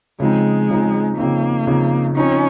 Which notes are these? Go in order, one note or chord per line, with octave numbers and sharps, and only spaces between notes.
C#3 F3 G#3 C4 D#4
C#3 F3 C4 D#4
C#3 F3 A#3 C4 D#4
C#3 F3 C4 D#4
F3 C4 C#4 D#4